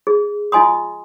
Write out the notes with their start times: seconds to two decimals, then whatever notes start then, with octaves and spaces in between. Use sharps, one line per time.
0.07 G#4
0.52 F4 D#5 G#5 C6 D#6